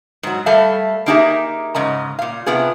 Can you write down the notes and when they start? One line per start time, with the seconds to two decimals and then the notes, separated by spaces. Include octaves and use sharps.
0.23 G#2 F#3
0.46 G3 A3 A4 E5 F5
1.06 A#3 D4 D#4 G4 G#4 E5
1.75 G#2 C#3 D#5 A#5
2.19 A#2 F5
2.46 A2 C3 B3 F4 G#4